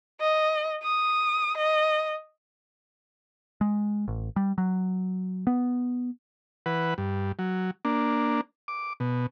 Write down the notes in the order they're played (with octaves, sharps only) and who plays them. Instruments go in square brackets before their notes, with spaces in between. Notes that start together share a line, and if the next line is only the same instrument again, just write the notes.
[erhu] D#5
D#6
D#5
[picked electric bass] G#3
A1
G3
F#3
B3
[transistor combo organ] E3 B4 F#5
G2
F#3
A#3 D4
D6
B2